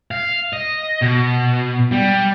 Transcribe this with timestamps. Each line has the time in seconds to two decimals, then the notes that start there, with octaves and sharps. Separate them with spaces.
0.11 F5
0.53 D#5
1.02 B2
1.92 G3